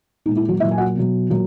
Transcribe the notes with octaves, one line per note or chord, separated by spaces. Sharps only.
A#2 G#3 D#4
E4
F#3 F#4
A#2 F#3 E4 E5
G#5
F#4 F#5
B2 F#3
A#2 F#3